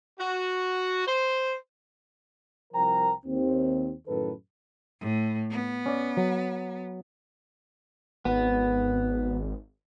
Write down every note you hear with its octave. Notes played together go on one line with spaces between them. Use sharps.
F#4
C5
C2 F3 A#4 C5 G5 A#5
D#2 C4
F#2 A2 D#3 A4 B4
A2
B3
C#4 D5
F#3
G#1 B3